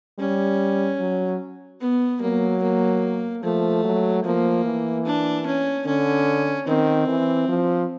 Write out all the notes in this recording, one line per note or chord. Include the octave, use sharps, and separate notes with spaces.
G3 C#4
F#3
B3
F#3 A#3
A#3
F3 A3
F#3
F3 A#3
E3
D4
C#4
D3 C#4
D#3 C4
E3
F3